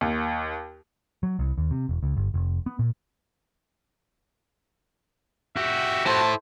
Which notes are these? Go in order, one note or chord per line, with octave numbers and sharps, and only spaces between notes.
D#2
F#3
C2
D#2
C3
E1
C#2
G1
F1
B3
A#2
F#4 G4 E5
E4 A4 C5 A5